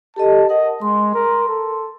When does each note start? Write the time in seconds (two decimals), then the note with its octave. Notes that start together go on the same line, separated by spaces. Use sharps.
0.16 G4 A4 D#5 A5
0.49 A#4 D#5 F#5 A5
0.82 G#3 C6
1.14 A#4
1.48 A4